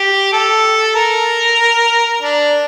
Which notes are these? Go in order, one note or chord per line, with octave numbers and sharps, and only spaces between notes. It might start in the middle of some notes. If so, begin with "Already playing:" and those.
Already playing: G4
A4
A#4
D4